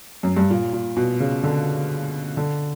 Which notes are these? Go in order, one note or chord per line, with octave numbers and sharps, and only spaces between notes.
F#2
G2
A#2
A#2
B2
C#3
D3
D3